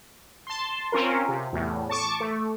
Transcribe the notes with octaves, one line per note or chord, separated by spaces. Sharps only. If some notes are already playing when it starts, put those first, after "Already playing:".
A5 C6
C4 C#4 F4 A#4
C3
E2 A2
A5 C#6 D6
A3